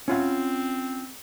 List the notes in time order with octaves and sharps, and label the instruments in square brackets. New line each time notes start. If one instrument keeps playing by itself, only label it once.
[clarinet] C4 [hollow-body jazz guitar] C#4 F4 F#5